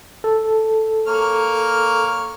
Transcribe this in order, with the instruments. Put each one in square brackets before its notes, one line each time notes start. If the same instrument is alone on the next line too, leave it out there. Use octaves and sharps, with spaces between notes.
[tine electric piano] A4
[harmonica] A#3 C#5 F6